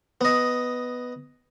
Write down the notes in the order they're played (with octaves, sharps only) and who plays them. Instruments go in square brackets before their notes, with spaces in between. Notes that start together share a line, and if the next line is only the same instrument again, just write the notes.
[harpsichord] B3 D#5